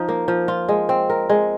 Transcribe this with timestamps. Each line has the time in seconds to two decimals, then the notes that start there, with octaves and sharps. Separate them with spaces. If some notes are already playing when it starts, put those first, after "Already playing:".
Already playing: F3 D#4
0.08 A#3
0.28 F3
0.48 F4
0.69 G#3
0.89 C4
1.10 A#4
1.30 G#3